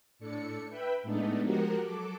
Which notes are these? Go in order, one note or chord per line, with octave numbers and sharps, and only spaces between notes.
A2 D4 A4 C#7
B4 E5 G5 B5
A2 G#3 A3 B3 D4 D#4
F3 G#3 F#4 G4 A#4 F#5
F#3 A4 D6